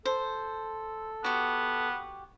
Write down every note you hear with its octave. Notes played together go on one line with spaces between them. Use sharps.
A4 C5
B3 F#4 G4